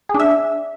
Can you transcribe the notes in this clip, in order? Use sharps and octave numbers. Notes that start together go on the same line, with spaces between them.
G#4
D4
E5